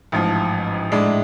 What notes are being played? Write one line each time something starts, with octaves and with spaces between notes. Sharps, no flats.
A1 G#2 F3
A2 G#3 D4